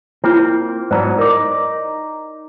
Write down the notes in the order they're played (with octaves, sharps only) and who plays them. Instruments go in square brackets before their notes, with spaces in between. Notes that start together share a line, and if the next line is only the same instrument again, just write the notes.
[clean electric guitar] A#3 C4 [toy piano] E4 F4
[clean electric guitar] G#2 F#3 B3 [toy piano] C5 D5 A#5
[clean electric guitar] D#4 D5 [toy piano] A#4